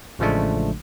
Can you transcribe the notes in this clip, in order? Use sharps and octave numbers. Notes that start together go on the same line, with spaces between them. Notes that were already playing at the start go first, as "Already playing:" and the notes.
A1 C#3 F3 G#3 A3 D4